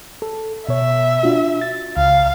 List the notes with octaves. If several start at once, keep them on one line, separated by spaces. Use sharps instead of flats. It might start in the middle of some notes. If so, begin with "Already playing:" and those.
A4
B2 C#5 E5
D4 F4 F#4
A6
C#2 F5